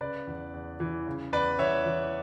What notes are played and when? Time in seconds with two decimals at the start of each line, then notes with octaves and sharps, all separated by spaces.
0.01 C#3 B4 D5
0.27 E2
0.54 E2
0.80 E3
1.07 C#3
1.33 E2 B4 D5
1.59 E2 C#5 E5
1.86 E3